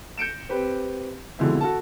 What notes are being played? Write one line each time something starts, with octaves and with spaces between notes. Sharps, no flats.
G6 C#7 D7 E7
C4 G4 B4
F2 B2 D3 G#3 E4
F#4 A4 A5